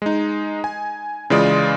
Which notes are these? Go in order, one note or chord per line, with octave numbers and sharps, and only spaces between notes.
G#3 D#4
G#5
C#3 E3 G#3 F4 D5 D#6